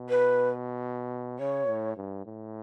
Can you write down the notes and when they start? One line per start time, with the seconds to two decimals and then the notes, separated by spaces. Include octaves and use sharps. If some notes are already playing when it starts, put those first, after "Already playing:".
Already playing: B2
0.10 B4
1.39 C#3 C#5
1.68 A2
1.97 G2
2.26 A2